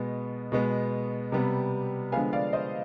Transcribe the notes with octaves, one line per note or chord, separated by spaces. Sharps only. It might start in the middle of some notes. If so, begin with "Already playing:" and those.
Already playing: B2 G#3 B3
B2 G#3 B3
C3 G3 B3
D3 F3 G#3 B3 F5 G#5
D5 F5
C5 D#5